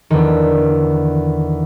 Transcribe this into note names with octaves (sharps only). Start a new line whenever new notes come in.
E2 D3 D#3